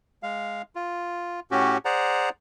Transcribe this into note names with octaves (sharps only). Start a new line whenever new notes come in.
G#3 F5
F4
A2 C#4 F#4 G4
G#4 C5 D5 F#5 A#5